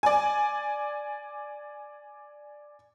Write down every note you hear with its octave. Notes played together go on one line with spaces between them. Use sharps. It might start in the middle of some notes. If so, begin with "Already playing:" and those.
D5 G#5